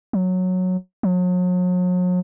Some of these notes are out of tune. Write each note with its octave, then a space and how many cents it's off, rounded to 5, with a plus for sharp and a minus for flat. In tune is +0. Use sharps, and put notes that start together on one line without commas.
F#3 -10
F#3 -40